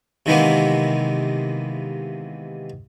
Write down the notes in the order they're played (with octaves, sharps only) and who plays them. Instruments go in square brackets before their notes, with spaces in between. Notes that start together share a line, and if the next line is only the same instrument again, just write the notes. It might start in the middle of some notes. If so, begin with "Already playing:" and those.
[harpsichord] C3 D#3 E3 G#3 A#3 B3